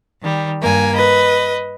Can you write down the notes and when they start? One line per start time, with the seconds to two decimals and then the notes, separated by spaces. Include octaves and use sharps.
0.22 D#3 G3
0.61 G2 A#3 G#5
0.95 B4 D#5